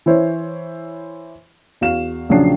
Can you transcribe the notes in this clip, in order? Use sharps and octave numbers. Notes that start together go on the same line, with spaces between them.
E3 E4 C5 C#5
E2 F#4 F5 E7
A#1 C#3 F3 F#3 D4 C7